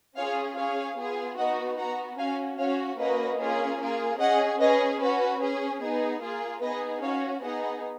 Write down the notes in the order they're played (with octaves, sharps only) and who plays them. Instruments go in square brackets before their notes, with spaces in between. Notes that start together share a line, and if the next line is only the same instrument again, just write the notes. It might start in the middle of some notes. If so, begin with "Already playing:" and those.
[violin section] C#4 F4 G#4 C#5 F5
C#4 G#4 C#5 F5
B3 F4 G#4
B3 D#4 F#4 D#5 F#5
B3 F#4 F#5 A#5
C#4 F#4 F5 G#5
C#4 F#4 C#5 F5
A#3 C#4 F#4 B4 D#5
A#3 C#4 F4 G#4
A#3 F4 G#4
C#4 G#4 D#5 F#5
C#4 G#4 B4 D#5
C#4 F#4 B4
C#4 G#4
B3 D#4 G#4
A#3 F4 G#4
B3 D#4 G#4 B4 D#5
C#4 F#4 C#5 F5
B3 D#4 G#4 D#5 F#5